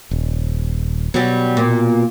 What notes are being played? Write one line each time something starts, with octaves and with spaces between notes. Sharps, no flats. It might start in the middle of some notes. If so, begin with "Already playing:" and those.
D#1
B2 F#3 G3
A#2